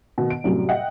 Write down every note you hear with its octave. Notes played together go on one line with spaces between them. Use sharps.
B2 D#3
D7
F#2 A2 C3 F#3 G3
D#5 E5 F#5 G5